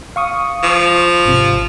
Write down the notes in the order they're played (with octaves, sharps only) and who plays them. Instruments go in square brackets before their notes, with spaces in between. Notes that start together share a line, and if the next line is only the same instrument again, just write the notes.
[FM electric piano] F5 C#6 D#6
[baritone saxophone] F3
[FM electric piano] G#1 C3